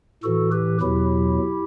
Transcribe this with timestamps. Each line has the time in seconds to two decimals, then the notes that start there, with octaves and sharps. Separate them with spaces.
0.24 A2 E3 F#4 A4
0.52 G4 B4
0.81 E2 B2 F#3 E4 G4